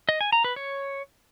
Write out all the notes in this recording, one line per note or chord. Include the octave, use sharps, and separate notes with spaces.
D#5
G#5
A#5
B4
C#5